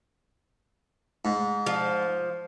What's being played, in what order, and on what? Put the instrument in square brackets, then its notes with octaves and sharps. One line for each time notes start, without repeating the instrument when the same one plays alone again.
[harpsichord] G#2
[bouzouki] F3